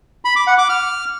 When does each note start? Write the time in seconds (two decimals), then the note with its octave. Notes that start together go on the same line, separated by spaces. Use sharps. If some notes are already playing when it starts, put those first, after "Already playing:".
0.25 B5
0.36 D6
0.47 F#5
0.58 D6
0.69 F6